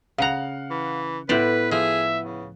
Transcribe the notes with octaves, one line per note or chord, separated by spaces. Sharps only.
C#3 F5 F#5 A#5 F#6
E3
A2 B3 E4 B4 C5 D5
F3 G#4 E5
C#3